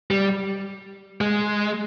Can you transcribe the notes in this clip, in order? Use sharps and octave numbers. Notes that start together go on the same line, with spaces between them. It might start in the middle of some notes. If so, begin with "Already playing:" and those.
G3
G#3